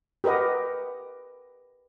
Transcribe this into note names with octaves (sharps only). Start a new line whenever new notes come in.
G4 A#4 B4 D#5 F#5